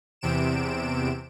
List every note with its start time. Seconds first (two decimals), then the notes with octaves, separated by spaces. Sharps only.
0.21 E2 C3 D7 E7